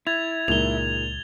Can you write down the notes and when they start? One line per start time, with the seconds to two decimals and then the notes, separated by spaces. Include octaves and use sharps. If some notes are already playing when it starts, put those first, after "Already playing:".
0.07 E4 G#6 A6 F7
0.48 C#2 A#2 G#3 D#4 F7 G7